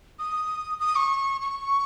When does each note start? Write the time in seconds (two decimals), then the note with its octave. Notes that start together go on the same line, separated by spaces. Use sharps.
0.19 D#6
0.80 D#6
0.96 C#6
1.42 C#6